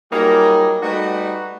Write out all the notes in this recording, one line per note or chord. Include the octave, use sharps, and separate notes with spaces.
F#3 G3 A#3 D#4 F4 G#4
G3 A3 D#4 F#4 B4